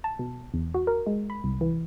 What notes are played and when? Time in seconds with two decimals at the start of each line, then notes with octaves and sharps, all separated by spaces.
0.04 A5
0.19 B2
0.54 E2
0.74 F#4
0.87 A#4
1.06 G#3
1.30 B5
1.44 C2
1.61 E3